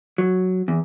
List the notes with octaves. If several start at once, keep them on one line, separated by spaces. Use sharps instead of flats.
F#3
E2